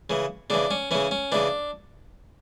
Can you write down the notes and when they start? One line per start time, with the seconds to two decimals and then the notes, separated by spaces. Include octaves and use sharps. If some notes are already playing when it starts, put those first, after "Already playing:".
0.10 C#3 E3
0.50 C#3 E3 D4
0.71 C#4
0.91 C#3 E3 C#4
1.11 C#4
1.32 C#3 E3 D4